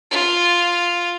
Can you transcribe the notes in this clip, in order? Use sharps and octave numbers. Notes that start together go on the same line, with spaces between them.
F4